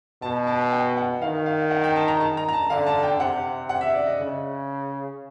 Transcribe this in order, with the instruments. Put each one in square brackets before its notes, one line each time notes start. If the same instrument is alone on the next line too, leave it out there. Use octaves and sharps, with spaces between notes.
[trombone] B2 [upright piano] A5
[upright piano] A5
G5
F#5
[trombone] D#3 [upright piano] F5
[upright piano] F5
F#5
G5
A5
A#5
A5
A#5
A#5
A5
[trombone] D3 [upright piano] F5
[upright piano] A5
G5
[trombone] C3 [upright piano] F#5
[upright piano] F#5
E5
D5
D#5
[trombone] C#3